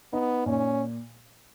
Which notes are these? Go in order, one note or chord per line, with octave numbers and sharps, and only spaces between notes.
B3 D#4
A#2 C#4